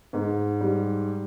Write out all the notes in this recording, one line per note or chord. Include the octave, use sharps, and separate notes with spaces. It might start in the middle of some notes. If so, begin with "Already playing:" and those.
G#2
G3